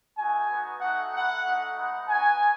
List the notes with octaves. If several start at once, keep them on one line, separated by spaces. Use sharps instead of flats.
A3 D#4 F#4 G#5
B3 D#4 F#4
A3 D#4 F#4 F#5
A3 E4 F#5
A3 D#4 F#4
G#3 B3 D#4 F#5
B3 D#4 F#4 G#5